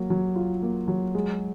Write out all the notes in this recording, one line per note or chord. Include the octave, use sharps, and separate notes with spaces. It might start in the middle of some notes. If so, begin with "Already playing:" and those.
Already playing: F#3 A#3
F#3
F4
A#3
F#3
G#3